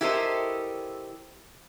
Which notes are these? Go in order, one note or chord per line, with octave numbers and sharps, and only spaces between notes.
E4 G4 A4 A#4 C5 D#5